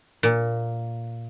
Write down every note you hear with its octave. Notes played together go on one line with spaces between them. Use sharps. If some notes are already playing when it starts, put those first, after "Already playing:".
A#2